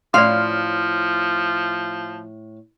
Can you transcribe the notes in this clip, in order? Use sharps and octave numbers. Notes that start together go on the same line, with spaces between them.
A2 F3 C#4 D5 F5 C6